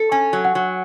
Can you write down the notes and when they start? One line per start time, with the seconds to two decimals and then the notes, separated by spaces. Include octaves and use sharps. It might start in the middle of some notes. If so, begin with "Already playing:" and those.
Already playing: A4
0.12 C#4 G#5
0.33 F#3
0.45 F#5
0.55 F#3